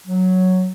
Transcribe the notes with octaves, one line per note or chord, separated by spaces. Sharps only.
F#3